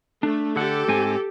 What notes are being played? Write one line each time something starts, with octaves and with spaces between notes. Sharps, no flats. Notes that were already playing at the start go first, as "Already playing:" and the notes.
A3 D4
D3 G4 A4 F#5
G#2 C4 G#5